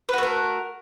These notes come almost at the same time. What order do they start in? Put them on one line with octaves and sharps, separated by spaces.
B4 F#4 A3 A#4